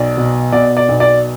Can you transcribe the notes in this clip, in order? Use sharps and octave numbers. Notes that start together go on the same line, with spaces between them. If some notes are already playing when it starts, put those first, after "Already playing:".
Already playing: B1 D5
B2
B2 D5
D5
B1
D5